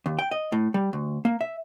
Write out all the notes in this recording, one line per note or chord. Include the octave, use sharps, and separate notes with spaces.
D#2
G5
D#5
A2
G3
D2
A#3
E5